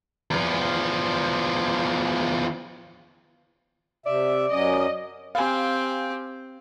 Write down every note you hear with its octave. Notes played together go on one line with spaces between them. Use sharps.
E2 F3
C3 D5 E5
F#2 F#3 C#4 D#5
C4 G4 F5 G#5